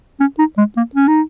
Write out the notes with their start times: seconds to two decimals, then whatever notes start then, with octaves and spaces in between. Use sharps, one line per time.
0.20 C#4
0.39 D#4
0.58 G#3
0.77 A#3
0.95 C#4
1.08 D#4